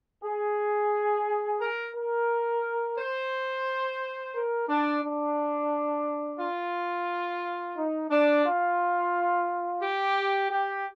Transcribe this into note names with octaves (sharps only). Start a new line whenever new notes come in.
G#4
A#4
A#4
C5
A#4
D4
D4
F4
D#4
D4
F4
G4
G4